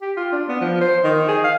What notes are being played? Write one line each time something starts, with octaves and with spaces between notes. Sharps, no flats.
G4
F4
D4
B3
F3
C5
D#3
G#4
F5